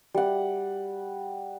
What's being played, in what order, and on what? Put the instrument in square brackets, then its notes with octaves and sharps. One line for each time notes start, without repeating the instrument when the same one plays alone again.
[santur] G3 F#5